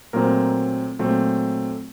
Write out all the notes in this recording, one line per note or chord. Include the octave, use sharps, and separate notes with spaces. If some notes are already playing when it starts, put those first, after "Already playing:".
A#2 F#3 A3 C4 A#4
A#2 F#3 A3 C4